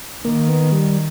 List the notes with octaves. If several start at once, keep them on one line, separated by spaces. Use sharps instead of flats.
D#3 A#3
B3
G3